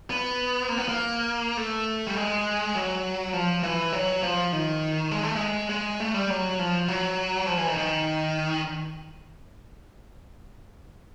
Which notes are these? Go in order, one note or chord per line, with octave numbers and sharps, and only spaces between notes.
B3
A#3
B3
A#3
A3
G3
G#3
F#3
F3
E3
F#3
F3
D#3
G#3
A3
G#3
G#3
A3
G3
F#3
F3
F#3
F3
E3
D#3
D#3